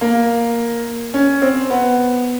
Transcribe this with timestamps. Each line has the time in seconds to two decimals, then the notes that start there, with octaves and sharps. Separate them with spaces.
0.01 A#3
1.14 C#4
1.42 C4
1.70 B3